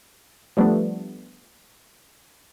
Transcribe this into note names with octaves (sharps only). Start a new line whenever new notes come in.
F3 G3 A3 B3 D4